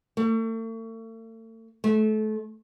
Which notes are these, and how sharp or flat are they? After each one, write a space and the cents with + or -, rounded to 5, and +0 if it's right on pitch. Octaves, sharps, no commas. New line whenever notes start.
A3 +40
A3 -30